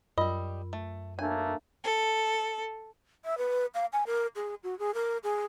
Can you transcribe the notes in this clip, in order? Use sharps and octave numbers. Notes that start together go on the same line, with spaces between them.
F#2 G3 F4 A#4 D#5
A3
B1 A3 A#3 D4 C#5 G#5
A4
E5
B4
F5
G#5
A#4
G#4
F#4
G#4
A#4
G#4